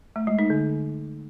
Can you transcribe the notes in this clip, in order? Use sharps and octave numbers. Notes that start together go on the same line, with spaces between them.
A3
G#3
D#4
D3